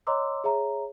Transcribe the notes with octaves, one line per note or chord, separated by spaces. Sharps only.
C#5 D#5 A#5 C6 D6 E6
G#4 C#5 E5 A#5